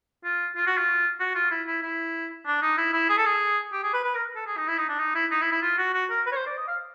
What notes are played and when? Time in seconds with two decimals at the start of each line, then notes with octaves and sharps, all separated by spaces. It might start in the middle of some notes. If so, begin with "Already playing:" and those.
0.24 F4
0.56 F4
0.67 F#4
0.78 F4
1.20 F#4
1.35 F4
1.51 E4
1.67 E4
1.83 E4
2.46 D4
2.62 D#4
2.78 E4
2.93 E4
3.09 G#4
3.18 A4
3.26 G#4
3.72 G4
3.83 G#4
3.93 B4
4.04 B4
4.15 A#4
4.36 A4
4.46 G#4
4.57 D#4
4.68 E4
4.78 D#4
4.89 D4
4.99 D#4
5.15 E4
5.31 D#4
5.41 E4
5.52 E4
5.62 F4
5.78 F#4
5.94 F#4
6.10 A#4
6.26 B4
6.32 C#5
6.36 C5
6.46 D5
6.57 D#5
6.68 F5